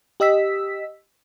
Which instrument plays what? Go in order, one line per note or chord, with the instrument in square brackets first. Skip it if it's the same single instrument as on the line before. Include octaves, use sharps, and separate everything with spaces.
[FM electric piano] G4 D#5 E6 B6